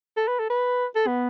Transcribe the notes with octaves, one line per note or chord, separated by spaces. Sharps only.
A4
B4
A4
B4
A4
B3